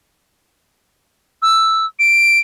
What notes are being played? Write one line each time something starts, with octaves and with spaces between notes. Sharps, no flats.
E6
D7